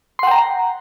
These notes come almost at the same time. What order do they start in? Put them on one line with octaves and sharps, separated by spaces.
C6 F#5 G5 A#5